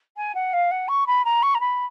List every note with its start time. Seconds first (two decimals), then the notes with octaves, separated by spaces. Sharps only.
0.17 G#5
0.34 F#5
0.53 F5
0.71 F#5
0.88 C#6
1.07 B5
1.24 A#5
1.42 C#6
1.54 A#5
1.60 B5